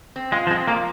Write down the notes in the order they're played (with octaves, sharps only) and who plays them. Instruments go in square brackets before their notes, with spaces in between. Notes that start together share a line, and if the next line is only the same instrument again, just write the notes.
[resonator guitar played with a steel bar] C4
[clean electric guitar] G#3 [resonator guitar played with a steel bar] F4
[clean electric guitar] F3
[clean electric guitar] G#3 [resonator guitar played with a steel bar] C4
[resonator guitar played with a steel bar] F3 [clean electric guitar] A#3